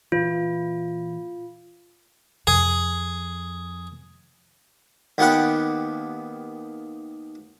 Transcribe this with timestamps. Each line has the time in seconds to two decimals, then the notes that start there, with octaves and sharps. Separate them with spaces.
0.12 A#2 E3 F4
2.47 F2 G#4
5.18 D#2 B3 G4 F#5 G5